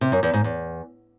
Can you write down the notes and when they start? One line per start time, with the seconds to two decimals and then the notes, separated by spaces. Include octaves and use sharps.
0.01 C3
0.12 F#2
0.23 E2
0.34 G#2
0.44 E2